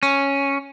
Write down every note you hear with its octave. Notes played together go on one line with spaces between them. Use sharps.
C#4